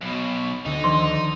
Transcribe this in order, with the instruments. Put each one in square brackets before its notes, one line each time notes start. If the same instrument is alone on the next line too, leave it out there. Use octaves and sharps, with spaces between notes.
[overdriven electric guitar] B1 B2
[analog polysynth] D2 D3 [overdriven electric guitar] D#4
[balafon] D#3 F3 [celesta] C6